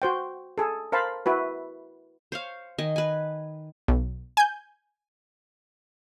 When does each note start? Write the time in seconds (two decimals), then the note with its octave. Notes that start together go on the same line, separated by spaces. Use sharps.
0.02 F#4 C5 G5
0.58 G#4 A4
0.92 A#4 C5 F5 A5 B5
1.26 E4 F#4 B4
2.32 C5 C#5 F5
2.78 D#3 D#5 G#5
2.96 B4 G#5
3.88 B1
4.37 G#5 G6